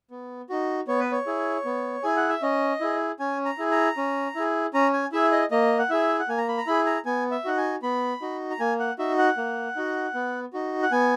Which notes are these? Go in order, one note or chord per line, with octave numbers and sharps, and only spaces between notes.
B3
D#4 F#4
B3 C#5
B4
C#5
E4 G#4
B3
E4 G#4 G#5
F#5
E5
C#4 D#5
E4 G#4
C#4 G#5
A#5
E4 G#4
A#5
C#4
E4 G#4
C#4 A#5
G#5
E4 G#4 E5
D#5
A#3 D#5
F#5
E4 G#4 E5
F#5
A#3 G#5
A#5
B5
A#5
E4 G#4 B5
A#5
B3 G#5
E5
D#4 F#4 F#5
G#5
B3 B5
D#4 F#4
A#5
A#3 G#5
F#5
D#4 F#4 E5
F#5
A#3
D#4 F#4
B3
D#4 F#4
F#5
B3 G#5